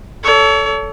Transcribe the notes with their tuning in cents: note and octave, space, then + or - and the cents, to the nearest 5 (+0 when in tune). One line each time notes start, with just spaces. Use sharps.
A4 +0 C#5 +35